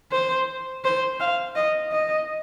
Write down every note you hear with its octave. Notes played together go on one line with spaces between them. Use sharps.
C5
C5
F5
D#5
D#5